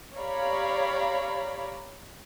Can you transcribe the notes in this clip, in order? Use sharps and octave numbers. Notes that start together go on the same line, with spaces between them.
G4 C#5 D5 F5 A#5 B5